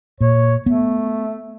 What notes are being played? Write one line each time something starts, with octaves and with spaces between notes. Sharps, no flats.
A#2 C#5
A3 B3